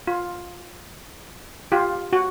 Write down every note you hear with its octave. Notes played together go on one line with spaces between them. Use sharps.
F4
F4 G4
F#4